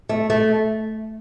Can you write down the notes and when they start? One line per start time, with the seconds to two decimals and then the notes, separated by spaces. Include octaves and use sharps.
0.09 A3
0.30 A3